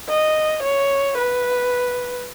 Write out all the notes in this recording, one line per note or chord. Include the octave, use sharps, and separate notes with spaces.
D#5
C#5
B4